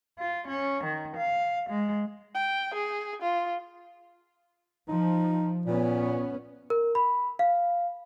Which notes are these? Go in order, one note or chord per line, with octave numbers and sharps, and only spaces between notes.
F4
C#4
D#3
F5
G#3
G5
G#4
F4
F3 D#4
A#2 B3 C#4
A#4
B5
F5